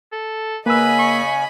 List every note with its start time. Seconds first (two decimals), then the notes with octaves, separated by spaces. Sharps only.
0.12 A4
0.66 C#3 A#3 B4 D#5 G#5 B5 E6
0.99 C#6